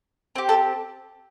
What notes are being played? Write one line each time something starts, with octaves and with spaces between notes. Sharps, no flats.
C4 G4
A4